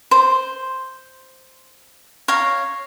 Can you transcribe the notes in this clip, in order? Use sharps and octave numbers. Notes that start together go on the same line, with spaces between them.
C5
C#5 F5 A#5